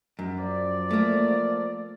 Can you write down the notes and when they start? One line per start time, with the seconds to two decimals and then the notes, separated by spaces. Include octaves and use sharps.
0.19 F#2
0.38 F3 D5
0.91 A3 A#3